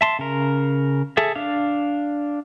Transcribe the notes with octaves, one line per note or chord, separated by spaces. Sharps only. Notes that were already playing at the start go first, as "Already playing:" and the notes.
E5 A5 C6
C#3 A#4
G#4 A4 E5
D4 F5